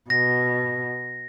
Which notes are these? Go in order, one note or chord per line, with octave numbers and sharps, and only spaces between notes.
B2 A#6